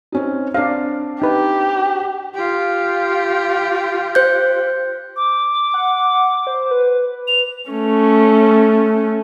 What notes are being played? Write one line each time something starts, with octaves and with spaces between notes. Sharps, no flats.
C4 C#4 D#4
C4 D4 D5 F5
D#4 G4 B4
F4 G4
C5 G6
D6
F#5
C5
B4
F7
A3 C#4